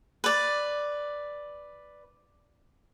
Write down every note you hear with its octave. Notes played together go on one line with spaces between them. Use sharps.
B4 D5